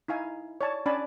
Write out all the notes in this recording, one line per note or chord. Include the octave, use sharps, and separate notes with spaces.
D#4 E4 F5 G#5
C#5 D5 A5
C#4 D4 D5 G#5 A5 B5